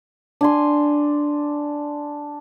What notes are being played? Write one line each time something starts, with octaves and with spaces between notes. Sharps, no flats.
D4 G#5 C6